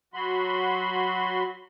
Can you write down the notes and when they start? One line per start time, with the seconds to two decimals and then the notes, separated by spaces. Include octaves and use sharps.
0.14 F#3 F#4 B5 C6